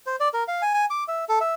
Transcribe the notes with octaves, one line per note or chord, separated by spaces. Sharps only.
C5
D5
A#4
F5
G#5
G#5
D6
E5
A4
E5